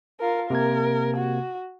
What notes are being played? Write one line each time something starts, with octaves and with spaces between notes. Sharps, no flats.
F4 A#4
C3 A#3 A#4 G#6
F#4